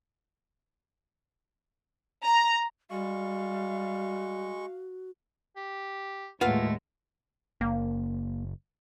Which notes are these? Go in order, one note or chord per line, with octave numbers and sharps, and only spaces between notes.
A#5
G3 G#3 F#4 F5 C#6
G4
D#2 A2 G#3 A3 F4 B4 F5 F#5
F#1 A#3